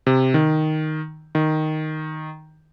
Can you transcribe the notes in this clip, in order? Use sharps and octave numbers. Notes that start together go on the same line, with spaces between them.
C3
D#3
D#3